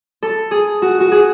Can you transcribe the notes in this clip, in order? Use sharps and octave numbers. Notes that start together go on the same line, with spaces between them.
A4
G#4
F#4
F#4
G#4